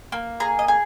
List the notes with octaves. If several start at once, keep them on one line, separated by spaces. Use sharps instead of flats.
A#3
G#4 A#5
D#5
G#4